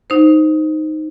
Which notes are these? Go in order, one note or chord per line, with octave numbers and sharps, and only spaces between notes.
D#4 C5